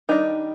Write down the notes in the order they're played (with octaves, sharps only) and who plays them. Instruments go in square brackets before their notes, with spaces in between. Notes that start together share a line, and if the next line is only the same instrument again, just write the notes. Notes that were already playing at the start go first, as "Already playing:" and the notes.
[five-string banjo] D#3 G3 B3 D4 D#4